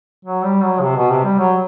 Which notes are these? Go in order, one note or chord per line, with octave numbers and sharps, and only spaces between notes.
F#3
G3
F#3
C3
B2
C3
G3
F#3